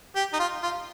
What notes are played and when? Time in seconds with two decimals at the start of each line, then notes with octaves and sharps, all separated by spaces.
0.16 G4
0.33 D#4
0.39 F4
0.63 F4